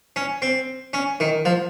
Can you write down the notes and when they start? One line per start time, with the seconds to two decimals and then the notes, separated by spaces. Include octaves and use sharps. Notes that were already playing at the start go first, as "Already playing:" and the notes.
0.16 C#4
0.42 C4
0.93 C#4
1.20 D#3
1.45 F3